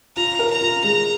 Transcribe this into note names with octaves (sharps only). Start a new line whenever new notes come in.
F4 A#5
A#4
A#5
F4
G#3 A#5